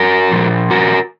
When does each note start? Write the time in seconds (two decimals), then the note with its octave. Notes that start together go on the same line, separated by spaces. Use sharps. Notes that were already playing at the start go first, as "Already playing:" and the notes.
Already playing: F#4 A#4
0.32 A#2 F3
0.71 F#4 A#4